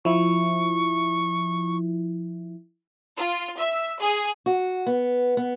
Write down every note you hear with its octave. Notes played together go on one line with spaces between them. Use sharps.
F3 E4 C#6
F4
E5
G#4
F#4
B3
B3